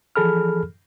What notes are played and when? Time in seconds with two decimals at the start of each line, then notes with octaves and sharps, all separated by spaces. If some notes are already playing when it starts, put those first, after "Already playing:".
0.16 E3 F3 G#4 A4 B5 F6